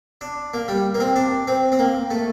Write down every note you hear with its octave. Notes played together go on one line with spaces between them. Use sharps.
D4
A#3
G3
A#3
C4
D4
C4
C4
A#3
A3